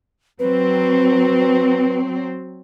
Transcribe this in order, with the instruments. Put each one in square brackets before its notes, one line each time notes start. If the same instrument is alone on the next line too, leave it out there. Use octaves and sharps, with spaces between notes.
[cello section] F#3 C4 [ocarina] B4